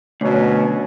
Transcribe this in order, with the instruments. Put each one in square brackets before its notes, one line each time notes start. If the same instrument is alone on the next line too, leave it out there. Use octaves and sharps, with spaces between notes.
[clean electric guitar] D2 [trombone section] B2 F#3 C#4